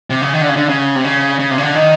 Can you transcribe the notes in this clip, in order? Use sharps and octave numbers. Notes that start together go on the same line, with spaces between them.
C3
C#3
D#3
D3
C#3
D3
C#3
C3
C#3
C#3
C3
C#3
D3
D#3